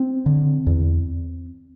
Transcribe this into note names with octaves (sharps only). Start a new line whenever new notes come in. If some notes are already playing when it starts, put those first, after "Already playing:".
Already playing: C4
D3
E2